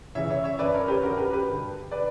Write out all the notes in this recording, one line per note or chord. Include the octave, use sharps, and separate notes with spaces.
F#2 C#3 E3 C#5 E5
C#5 E5
C#5 E5
F#2 D3 B4 D5
A#4 C#5
G4 B4
F#2 D3 F#4 A#4
G4 B4
G4 B4
G2 D3
B4 D5